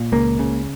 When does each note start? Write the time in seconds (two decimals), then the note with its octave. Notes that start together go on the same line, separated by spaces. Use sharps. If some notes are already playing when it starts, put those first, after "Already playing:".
Already playing: A#2
0.12 C#2 A#3
0.39 C#3